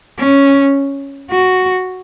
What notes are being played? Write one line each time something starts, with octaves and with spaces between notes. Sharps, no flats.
C#4
F#4